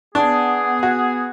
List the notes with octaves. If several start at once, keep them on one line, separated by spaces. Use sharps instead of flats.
B3 D4 G#4
F#4